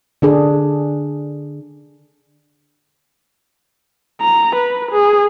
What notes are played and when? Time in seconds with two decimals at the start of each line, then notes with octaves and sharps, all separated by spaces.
0.22 D3 D4 G#4
4.21 A#5
4.55 B4
4.92 G#4